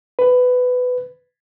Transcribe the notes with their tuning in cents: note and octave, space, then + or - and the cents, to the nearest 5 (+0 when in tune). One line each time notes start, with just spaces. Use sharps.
B4 +15